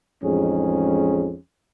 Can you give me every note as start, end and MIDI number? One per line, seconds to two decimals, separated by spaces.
0.22 1.35 33
0.22 1.35 41
0.22 1.35 56
0.22 1.35 61
0.22 1.35 63
0.22 1.35 68